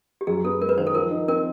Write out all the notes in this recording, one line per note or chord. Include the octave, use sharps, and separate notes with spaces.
G4
F#2 G#4
B3 A4
G#3 A#4
B4
D#3 C5
A4
F3 A#4
D#4
C4 A#4